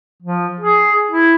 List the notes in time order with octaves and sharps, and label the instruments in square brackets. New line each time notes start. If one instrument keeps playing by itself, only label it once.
[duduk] F3
G#4
E4